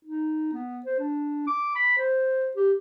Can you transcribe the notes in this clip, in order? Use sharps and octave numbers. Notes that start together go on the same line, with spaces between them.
D#4
B3
C5
D4
D6
B5
C5
G4